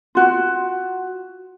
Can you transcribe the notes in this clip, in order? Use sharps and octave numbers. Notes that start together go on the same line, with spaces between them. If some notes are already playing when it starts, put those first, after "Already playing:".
F4 F#4